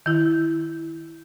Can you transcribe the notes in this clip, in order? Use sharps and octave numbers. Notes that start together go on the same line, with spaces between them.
D#3 E4